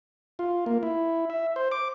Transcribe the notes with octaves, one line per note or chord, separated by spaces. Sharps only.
F4
A#3
E4
E5
C5
D6